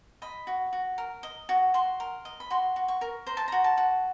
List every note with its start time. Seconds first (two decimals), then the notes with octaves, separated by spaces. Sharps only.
0.22 D#5 B5
0.47 F#4
0.73 F#4
0.98 A#4
1.23 D#5
1.49 F#4
1.74 F#4 C6
2.00 A#4
2.25 D#5
2.40 B5
2.50 F#4 C6
2.76 F#4
2.88 C#6
3.01 A#4
3.27 C5 A#5
3.37 A5
3.48 F#4 A#5
3.64 A5
3.77 F#4